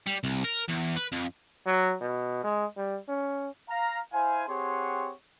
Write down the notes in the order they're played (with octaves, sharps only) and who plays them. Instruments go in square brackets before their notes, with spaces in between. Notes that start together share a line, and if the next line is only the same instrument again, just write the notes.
[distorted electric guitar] G3
C2
A#4
E2
B4
F2
[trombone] F#3
B2
G#3
G3
C#4
[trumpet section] F5 A#5
E4 C5 F5 G#5
C4 G4 G#4 C#5 F#5 C6